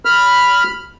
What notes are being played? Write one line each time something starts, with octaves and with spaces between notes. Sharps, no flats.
B5 F6